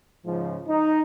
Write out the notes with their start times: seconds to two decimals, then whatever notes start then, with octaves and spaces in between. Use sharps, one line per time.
0.25 G#2 C#3 F3
0.68 D#4